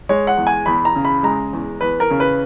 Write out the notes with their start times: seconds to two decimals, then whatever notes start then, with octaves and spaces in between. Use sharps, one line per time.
0.09 G#3 C#5
0.27 F#5
0.37 E2
0.47 G#5
0.66 E2 B5
0.85 A#5
0.96 C#3
1.05 B5
1.23 G#3 A#5
1.53 E2
1.81 E2 B4
2.00 A#4
2.10 C#3
2.20 B4